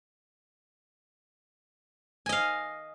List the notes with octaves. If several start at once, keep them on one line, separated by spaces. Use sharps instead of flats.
D#5 F5 G#5